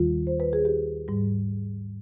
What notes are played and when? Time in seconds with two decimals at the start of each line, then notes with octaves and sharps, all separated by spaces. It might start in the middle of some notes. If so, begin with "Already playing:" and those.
Already playing: D#2 D#3 G3 F4
0.27 C5
0.40 B4
0.53 G#4
0.65 G4
1.08 G#2 G3